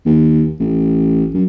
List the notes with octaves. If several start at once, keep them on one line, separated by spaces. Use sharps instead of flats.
D#2
A1
F#2